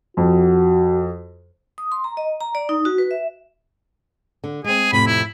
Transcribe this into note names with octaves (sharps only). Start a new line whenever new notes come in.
F2 F#4
D#6
C6
A#5
D#5
A#5
D5
D#4
F#4
B4
E5
D3
G#3 C4 G#4
F2 A2 C3 B5
E4